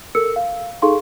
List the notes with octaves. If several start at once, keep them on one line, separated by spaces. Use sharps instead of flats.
A4 A#4 E6 C#7
F5
D#4 G#4 A4 F5 C6 C#6